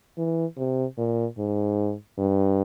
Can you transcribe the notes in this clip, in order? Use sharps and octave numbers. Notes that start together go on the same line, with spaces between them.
E3
C3
A#2
G#2
G2